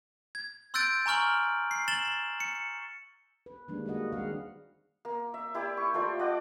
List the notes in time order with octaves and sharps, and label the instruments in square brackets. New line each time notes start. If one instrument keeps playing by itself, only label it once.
[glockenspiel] G#6
C6 E6 F#6 G6 A6 D7
G#5 A#5 C#6 F6 F#7
C7
A6 E7 F#7 G7
C#7
[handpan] B4
D#3 G3 G#3 A#3 D4
G#3 A#3 F#4 D#5 F#5
D#3 G#3 C4 F5 F#5
[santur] A#3
E5
E4 G4 D5 E5
C#6
A3 F4 C5 D5
D5 F#5 D6 D#6